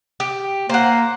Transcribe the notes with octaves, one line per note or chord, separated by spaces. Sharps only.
G4
A#3 C5 F#5